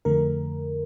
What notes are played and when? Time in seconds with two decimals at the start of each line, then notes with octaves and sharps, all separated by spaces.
0.05 F2 D3 A3 A#4